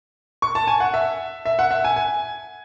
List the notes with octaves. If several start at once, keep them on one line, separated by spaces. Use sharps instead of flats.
C#6
A5
G#5
F#5
E5
E5
F#5
E5
G#5
G#5